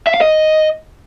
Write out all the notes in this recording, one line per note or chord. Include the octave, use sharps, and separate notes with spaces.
E5
F5
D#5